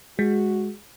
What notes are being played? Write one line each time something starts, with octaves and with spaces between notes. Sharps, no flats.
G#3 F#4